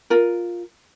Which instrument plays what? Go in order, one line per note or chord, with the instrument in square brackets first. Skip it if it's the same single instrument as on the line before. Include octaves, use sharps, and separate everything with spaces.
[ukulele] F4 A#4